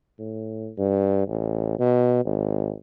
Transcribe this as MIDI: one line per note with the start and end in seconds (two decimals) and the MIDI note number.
0.19 0.70 45
0.78 1.25 43
1.28 1.79 33
1.79 2.22 47
2.25 2.72 32